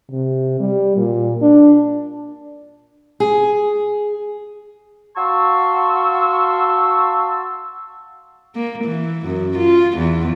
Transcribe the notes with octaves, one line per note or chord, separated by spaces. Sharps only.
C3
G3
A#2
D4
G#4
F#4 F5 A5 C6 C#6 E6
A#3
E3
F#2
F4
E2